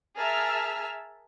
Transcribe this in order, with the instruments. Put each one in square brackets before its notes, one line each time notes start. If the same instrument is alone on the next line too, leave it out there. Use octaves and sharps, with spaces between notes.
[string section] G#4 A#4 E5 A5 E6 F6